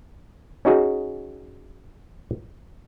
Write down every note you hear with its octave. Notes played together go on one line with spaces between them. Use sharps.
C#4 D#4 F#4 G#4